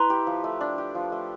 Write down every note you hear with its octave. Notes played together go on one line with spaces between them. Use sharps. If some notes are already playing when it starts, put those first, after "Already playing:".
Already playing: E4 B4 D#5 A#5 C6
G4
F3
A3
D4
G4
F3
A3